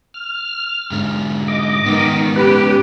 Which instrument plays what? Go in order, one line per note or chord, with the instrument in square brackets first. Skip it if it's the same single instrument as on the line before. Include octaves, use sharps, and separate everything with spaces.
[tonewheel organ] F6
[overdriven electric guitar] G#2 D3
[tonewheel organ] D#5 D6
[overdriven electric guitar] G#2 B3 [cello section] D#3
[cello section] C#4 G4 [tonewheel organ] B4